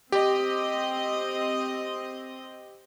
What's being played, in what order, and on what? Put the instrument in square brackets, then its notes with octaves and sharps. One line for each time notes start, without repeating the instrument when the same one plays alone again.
[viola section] C4 D#5 [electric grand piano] G4